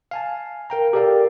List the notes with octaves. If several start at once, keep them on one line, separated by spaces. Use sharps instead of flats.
F5 G#5 A5
A#4 G5 A#5
G4 A4 A#4 D5 F5 G5